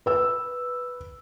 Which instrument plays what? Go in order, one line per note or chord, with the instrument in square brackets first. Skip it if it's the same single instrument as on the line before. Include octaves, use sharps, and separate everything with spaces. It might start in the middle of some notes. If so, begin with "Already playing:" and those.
[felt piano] B4 E6